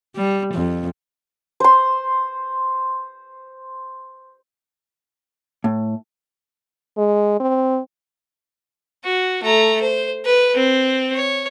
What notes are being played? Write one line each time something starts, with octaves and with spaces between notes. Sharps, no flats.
G3
F2
C5 C6
A2
G#3
C4
F#4
A3 A#5
C5
B4
C4
C#5